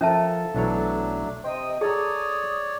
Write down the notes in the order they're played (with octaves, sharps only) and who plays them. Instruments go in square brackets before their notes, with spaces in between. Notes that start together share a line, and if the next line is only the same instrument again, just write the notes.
[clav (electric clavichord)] F3 A#4 [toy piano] C#4 E5 A5 [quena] A4
[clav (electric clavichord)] B1 E3 C#5 [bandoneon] F#3 A3 D4
[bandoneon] C3 G5 [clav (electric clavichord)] C5 [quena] D#5
[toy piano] G#4 [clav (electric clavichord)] A4 A#5 [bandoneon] C#5 D5 [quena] D#6